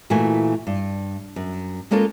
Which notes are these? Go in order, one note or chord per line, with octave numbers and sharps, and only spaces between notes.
A#2 E3 A3 F#4 G#5
G2
F#2
G#3 A#3 C#4 F4 A4 C#5